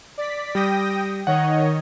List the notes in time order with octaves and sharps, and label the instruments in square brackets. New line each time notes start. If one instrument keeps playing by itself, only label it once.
[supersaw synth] D5 B6
[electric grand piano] G3 [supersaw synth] G5 D#6 A#6
[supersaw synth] D#3 C#5 D#5 [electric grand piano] F#5